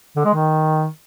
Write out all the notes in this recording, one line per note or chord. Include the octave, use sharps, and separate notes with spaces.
D3
G#3
D#3